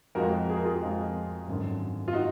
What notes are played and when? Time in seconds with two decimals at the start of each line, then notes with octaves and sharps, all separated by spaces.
0.15 F2 F3 G#3 F#4 A#4
0.49 G#4
0.56 A#4
0.65 F4 G#4
0.82 F2 F3 G#3
1.47 G#1 F#2 D3
2.08 F4
2.13 D#4 F#4